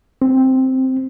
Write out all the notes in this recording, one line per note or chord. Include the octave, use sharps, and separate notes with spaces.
C4